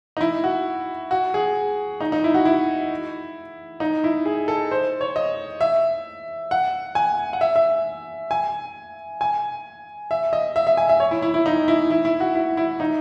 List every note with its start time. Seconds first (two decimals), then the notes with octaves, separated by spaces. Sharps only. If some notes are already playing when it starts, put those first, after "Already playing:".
0.17 D#4
0.21 E4
0.44 F#4
1.11 F#4
1.34 G#4
2.01 D#4
2.12 D#4
2.24 E4
2.34 F#4
2.45 E4
3.80 D#4
4.04 E4
4.25 G#4
4.48 A4
4.71 C5
5.01 C#5
5.16 D#5
5.61 E5
6.51 F#5
6.95 G#5
7.33 F#5
7.41 E5
7.56 E5
8.31 G#5
9.21 G#5
10.11 E5
10.33 D#5
10.56 E5
10.67 E5
10.77 G#5
10.89 E5
11.00 C#5
11.11 E4
11.22 E4
11.34 E4
11.46 D#4
11.68 E4
11.90 E4
12.05 E4
12.20 F#4
12.35 E4
12.57 E4
12.80 D#4